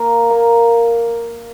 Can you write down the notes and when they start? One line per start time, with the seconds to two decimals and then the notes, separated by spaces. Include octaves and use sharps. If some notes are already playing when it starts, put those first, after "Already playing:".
Already playing: A#3
0.30 A#3